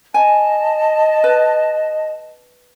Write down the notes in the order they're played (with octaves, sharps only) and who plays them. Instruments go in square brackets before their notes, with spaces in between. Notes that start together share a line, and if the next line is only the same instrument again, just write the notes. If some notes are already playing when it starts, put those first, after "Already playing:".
[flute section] D#5 A5 [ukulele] G#5
[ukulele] B4